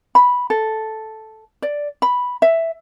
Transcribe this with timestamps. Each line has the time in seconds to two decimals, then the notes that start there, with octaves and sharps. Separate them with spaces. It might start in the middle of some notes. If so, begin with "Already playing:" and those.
0.15 B5
0.50 A4
1.62 D5
2.02 B5
2.42 E5